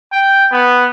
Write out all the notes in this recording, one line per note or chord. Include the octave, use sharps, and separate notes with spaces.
G5
B3